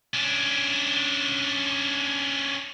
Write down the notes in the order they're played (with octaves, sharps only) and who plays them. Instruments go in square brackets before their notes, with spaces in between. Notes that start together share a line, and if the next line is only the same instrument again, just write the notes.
[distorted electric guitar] C#4 D4